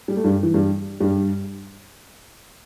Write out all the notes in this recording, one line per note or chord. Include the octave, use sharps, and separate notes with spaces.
G3
A3
G2 G3
E3
G2 G3
G2 G3